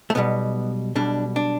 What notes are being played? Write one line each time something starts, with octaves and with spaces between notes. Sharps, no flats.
A3
B1 B2 G3 B3
B1 B2 G3 D4
D4